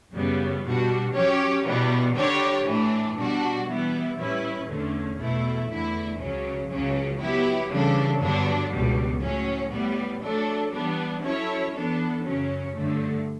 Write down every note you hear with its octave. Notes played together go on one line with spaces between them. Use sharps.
F#2 C#3 G3 B3
B2 G3 D4 F#4
F#3 C#4 G4 C#5
E2 B2 G3 B3
D3 G3 D4 G4 C#5
A2 E3 A3 D4
B2 G3 D4 F#4
E3 G3 B3 E4
A2 G3 C#4 E4 B4
E2 D3 A3 C#4
E2 B2 A3 E4
E2 D3 A3 E4
C#2 C#3 F#3 C#4
C#2 C#3 F#3 C#4
F#3 B3 E4 G4
C#3 E3 G3 D4 A4
G2 D3 F#3 B3 D4
C#2 B2 G3
A2 F#3 C#4
A2 G3 B3
F#3 A3 D4 A4
E3 G3 B3 D4
F#3 C#4 E4 A4 C#5
E3 B3 D4 A4
F#2 C#3 F#3 C#4
G2 D3 A3